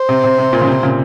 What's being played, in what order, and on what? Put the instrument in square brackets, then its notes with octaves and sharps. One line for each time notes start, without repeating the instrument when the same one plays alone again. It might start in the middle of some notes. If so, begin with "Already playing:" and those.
Already playing: [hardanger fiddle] C5
[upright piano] C3
C3
C3
A#2
C#3
C3
A#2 C#3